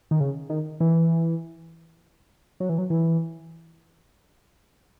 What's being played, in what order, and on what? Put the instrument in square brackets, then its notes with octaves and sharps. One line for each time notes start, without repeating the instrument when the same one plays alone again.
[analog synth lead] D#3
C#3
D#3
E3
F#3
E3
F#3
E3